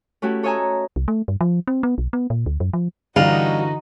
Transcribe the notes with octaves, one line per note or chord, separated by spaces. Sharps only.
A3 C#4 E4 F#4 G4
A4 C#5 D#5 E5 G#5 A#5
C2
A3
G2
F3
C4
B3
B1
B3
A#2
D2
F#2
F3
G2 D3 E3 D#4 F#4 D#5 F5